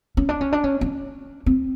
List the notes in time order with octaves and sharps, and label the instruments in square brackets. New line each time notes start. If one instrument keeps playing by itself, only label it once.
[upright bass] C#4
D4
C#4
D4
C#4
C#4
C4